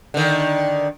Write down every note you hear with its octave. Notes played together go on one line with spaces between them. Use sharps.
D3 D#3